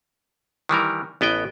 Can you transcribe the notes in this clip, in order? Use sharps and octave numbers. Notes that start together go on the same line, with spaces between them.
D#3 E3 G3 A#4
A1 B3 D#5 G5